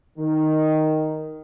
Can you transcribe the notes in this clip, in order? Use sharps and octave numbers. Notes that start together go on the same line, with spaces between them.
D#3